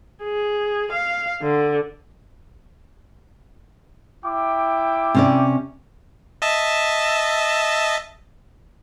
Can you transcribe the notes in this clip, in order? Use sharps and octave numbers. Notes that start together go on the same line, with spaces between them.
G#4
F5
D3
E4 G5 D6
C3 C#4 D5
D#5 E5 A5